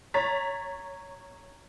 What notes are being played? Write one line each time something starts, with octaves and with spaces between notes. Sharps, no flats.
C#5 A#5 A6 B6